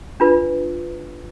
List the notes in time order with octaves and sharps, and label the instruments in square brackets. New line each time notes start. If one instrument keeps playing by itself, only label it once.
[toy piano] D4 F4 B4